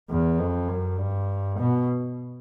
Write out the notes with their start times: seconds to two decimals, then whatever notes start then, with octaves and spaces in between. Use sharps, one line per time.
0.10 E2
0.39 F2
0.69 F#2
0.99 G2
1.59 B2